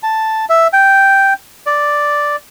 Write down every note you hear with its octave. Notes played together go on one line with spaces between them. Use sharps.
A5
E5
G5
D5